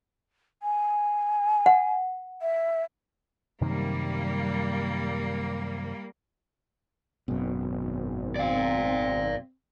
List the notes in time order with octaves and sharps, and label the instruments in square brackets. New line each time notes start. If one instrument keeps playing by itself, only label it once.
[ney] G#5
[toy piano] F#5
[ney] E5
[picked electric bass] F#2 C3 D#3 [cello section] G3 A#3
[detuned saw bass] G#1 [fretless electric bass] F#2 B2
[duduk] C4 [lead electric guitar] D5 F5